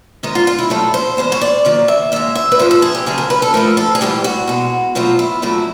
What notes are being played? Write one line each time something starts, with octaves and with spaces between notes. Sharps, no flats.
G#2 D#3 G#3 D#4
F4
F4
E4
G2 D#3 F#3 A3 A4
C5
E2 B2 G#3 C5
C#5
D5
D#2 D#3 F#3 D5
E5
D#2 D#3 G#3 E5
E5
B4
G#2 F3 G#3 C5
A4
G#4
G4
D2 C#3 F#3 A3 G#4
A#4
B4
A4
A2 F3 A3 A#4
A4
G#4
G#2 E3 G3 G4
F#4
B2 G#3
B2 F#3 A3 F4
E4
F2 D3 F#3 A3 E4